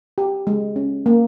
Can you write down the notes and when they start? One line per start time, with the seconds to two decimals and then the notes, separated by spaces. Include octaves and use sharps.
0.18 G4
0.47 G#3
0.76 C#4
1.06 A#3